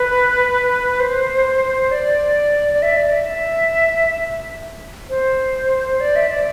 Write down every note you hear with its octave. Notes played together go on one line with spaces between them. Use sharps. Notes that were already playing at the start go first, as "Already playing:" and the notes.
Already playing: B4
C5
D5
D5
E5
D5
E5
C5
D5
E5
D5